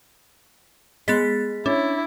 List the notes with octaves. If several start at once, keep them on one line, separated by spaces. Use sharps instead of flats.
G#3 B3 A6 B6
C#4 D4 E4